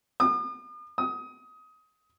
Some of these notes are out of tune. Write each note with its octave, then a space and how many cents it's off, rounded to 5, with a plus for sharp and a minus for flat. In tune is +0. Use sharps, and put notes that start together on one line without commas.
D#6 -45
D#6 +20